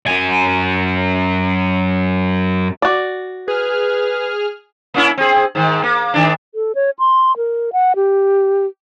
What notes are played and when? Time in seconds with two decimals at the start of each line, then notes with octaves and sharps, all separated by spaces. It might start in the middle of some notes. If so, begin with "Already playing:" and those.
0.07 F#2 G#5
2.82 F#4 D5
3.48 G#4 B4 F6
4.94 A#3 C#4 E4
5.17 C4 G#4
5.55 G#2 D#3
5.83 A#3
6.14 G#2 D#3 D4
6.55 A4
6.75 C#5
6.99 C6
7.37 A#4
7.73 F#5
7.96 G4